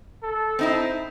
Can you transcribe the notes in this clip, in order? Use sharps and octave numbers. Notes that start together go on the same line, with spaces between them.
A4
C4 D#4 E4